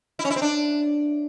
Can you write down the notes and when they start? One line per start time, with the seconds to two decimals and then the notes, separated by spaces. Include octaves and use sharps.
0.19 E4
0.25 C#4
0.30 E4
0.36 C4
0.42 D4